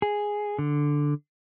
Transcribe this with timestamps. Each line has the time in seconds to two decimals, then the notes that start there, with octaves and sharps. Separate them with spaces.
0.02 G#4
0.59 D3